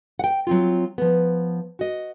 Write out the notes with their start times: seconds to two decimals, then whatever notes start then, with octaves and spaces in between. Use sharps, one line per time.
0.19 F#5 G5
0.47 F#3 C4 F4
0.98 F3 B3
1.79 F#4 D#5